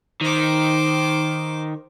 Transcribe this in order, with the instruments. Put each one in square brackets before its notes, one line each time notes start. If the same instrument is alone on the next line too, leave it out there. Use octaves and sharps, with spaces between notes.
[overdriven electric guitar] D#3 [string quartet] C5 D6